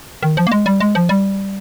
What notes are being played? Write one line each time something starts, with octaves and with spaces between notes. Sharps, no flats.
D#3
F3
A#3
G#3
G3
G#3
F3
G3